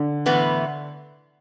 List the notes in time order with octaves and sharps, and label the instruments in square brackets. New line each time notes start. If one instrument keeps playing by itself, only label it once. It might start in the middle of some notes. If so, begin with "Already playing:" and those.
Already playing: [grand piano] D3
[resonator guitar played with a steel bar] A2 E3 B3